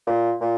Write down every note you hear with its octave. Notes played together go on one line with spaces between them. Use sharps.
A#2
A#2